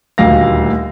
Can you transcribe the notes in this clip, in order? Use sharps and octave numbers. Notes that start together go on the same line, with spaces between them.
D#1 D2 F5 A#6